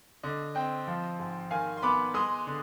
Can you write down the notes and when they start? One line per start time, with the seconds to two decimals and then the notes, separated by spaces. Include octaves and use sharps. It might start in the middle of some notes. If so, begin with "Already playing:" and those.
0.23 D3 D#5
0.55 C4 D#5 G5
0.88 F3
1.19 G#2
1.51 D#3 F5 G#5
1.77 C6
1.83 B3 B5 D6
2.14 G#3 C6 D#6
2.47 D3